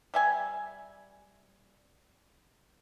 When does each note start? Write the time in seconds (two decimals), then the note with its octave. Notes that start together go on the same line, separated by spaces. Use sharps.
0.14 G3 E5 G#5